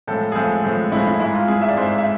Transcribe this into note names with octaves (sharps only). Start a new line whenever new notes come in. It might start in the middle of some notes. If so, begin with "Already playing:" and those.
A2 F3 G#3 A4
G#4
A2 F3 G#3 A4
A2 F3 G#3
A2 F3 G#3 E4
E4
G#2 G#3 E4
F4
G#2 G#3 G#4
E5
D5
G#2 G#3 C5
E5